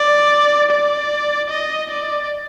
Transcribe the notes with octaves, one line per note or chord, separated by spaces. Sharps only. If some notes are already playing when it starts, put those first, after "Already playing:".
Already playing: D5
D5
D#5
D5